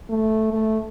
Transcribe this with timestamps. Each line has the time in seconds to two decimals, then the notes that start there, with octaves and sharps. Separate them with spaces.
0.10 A3
0.53 A3